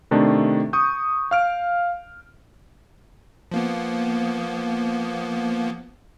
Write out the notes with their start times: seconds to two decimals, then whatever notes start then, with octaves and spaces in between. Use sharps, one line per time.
0.11 C3 D#3 A3 D4
0.73 C#6 D#6 G6
1.31 F5 F6 D7
3.52 F3 A#3 B3